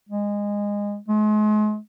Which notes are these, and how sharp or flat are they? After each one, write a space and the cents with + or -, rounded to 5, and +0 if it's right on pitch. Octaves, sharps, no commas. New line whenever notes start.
G#3 -20
G#3 +40